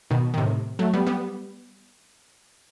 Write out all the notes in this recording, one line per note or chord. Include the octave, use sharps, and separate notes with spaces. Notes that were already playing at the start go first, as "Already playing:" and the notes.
B2 D#3
D#3
A2 C3
F#3 A3
G3 B3
G3 B3